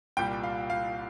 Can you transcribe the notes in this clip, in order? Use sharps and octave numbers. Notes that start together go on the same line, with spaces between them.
C2 A#2 G3 G5
F5
F5